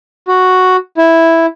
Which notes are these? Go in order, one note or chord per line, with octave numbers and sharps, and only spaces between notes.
F#4
E4